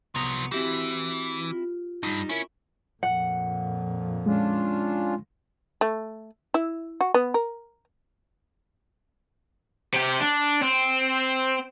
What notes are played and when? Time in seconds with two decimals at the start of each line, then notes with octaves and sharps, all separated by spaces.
0.15 C2 F3 F#3 B3 A#5 D#6
0.52 E3 C4 E4 F#4 G4
1.51 F4
2.03 G2 G3 D#4
2.29 C#4 E4 A#4
3.03 F2 A#2 F#5
4.26 G#3 C#4 D4 F4
5.81 A3
6.54 E4
7.01 F#4
7.14 B3
7.34 A#4
9.94 C3 G4
10.21 D4
10.62 C4